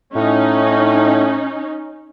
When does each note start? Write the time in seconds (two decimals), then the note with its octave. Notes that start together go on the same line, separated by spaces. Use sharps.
0.15 A2 C#4 D#4